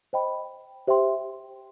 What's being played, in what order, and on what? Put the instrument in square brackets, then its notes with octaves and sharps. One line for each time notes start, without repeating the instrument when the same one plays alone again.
[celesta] C5 D#5 G5 B5
G4 C5 E5 G5 C6